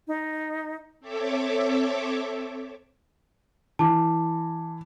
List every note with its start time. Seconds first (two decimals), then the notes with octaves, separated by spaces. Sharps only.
0.08 D#4
1.00 C4 A4 C#5 E5 D6
3.79 E3 A5 D6